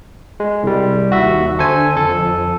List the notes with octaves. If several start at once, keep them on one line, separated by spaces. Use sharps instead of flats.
G#3
C2 G3
D#2 F#4 E5
D3 A4 C5 G#5
F2 A4